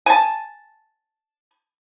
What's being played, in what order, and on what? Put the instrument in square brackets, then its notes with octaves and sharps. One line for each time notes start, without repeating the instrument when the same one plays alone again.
[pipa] G#5 A5